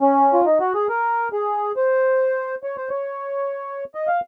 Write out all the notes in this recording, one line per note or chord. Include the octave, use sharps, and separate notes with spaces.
C#4
F4
D#4
F#4
G#4
A#4
G#4
C5
C#5
C5
C#5
D#5
F5